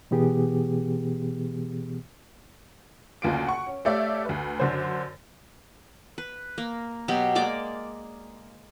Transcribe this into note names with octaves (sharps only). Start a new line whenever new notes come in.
B2 E3 B3 G4 G#4
F#1 D2 F4 D7
F#5 C#6
C#4
A3 G4 C#5 D5 E5 F5
D2 B4
F#2 D3 C5
B4
A#3
B2 F#3 B3 G4
G#3 A#3 D5 D6